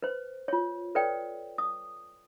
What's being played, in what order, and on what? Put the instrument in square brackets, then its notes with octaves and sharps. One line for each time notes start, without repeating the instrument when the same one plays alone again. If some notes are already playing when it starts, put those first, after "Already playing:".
[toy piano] B4 C5
F4 C#5
A4 B4 C#5 D5 G5
D#6